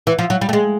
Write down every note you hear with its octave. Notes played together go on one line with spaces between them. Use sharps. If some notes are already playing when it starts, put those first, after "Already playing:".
E3
F3
F#3
G3
A3
G#3